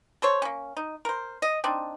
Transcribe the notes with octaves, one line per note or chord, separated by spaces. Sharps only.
A4 C5 C#5
A#3 C#4
D#4
A#4 C5
D#5
C4 D4 D#4